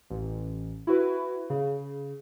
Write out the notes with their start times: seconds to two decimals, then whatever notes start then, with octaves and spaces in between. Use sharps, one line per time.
0.10 A1
0.87 E4 F#4 B4
1.50 C#3